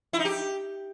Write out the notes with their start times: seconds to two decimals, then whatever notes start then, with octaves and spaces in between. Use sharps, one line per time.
0.13 E4
0.19 D#4
0.25 G4